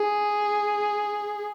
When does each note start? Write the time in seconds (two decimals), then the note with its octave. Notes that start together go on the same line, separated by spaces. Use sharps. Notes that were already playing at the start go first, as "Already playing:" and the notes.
Already playing: G#4